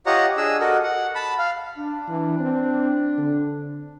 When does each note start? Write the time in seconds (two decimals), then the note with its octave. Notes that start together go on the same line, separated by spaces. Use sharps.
0.06 F4 G4 C#5 D#5 F#5 A#5
0.37 D4 G#4 D#5 E6
0.60 F#4 A4 A#4 D#5
0.83 F#5
1.15 A5 B5
1.39 F5
1.77 D4
2.08 E3
2.39 C4
3.18 D3